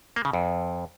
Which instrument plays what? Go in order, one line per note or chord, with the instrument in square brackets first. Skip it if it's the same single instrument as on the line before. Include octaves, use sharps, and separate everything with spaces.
[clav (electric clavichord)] A#3
C#3
F2